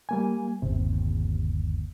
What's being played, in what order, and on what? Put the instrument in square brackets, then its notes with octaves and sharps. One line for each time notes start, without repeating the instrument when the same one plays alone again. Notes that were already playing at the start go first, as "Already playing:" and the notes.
[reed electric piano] G3 A#3 G#5
[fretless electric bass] G1 D#2 [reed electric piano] C3